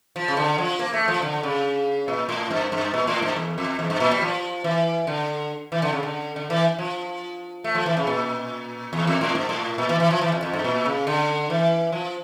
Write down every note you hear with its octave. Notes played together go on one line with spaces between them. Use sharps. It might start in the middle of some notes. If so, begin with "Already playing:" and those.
F3
C#3
D3
F3
A#3
A3
F3
D3
C#3
A#2
A2
G2
G2
A#2
A2
G2
E2
F2
E2
G2
A#2
G3
F3
E3
D3
E3
D3
C#3
D3
D3
E3
F3
A3
F3
E3
C#3
A#2
E2
F2
A2
G2
A2
A#2
E3
E3
F3
E3
F2
F2
G2
A#2
C#3
D3
E3
F3